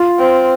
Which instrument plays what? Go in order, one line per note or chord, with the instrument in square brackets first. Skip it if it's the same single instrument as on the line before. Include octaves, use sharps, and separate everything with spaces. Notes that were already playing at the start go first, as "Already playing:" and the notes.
Already playing: [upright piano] F4
[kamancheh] C4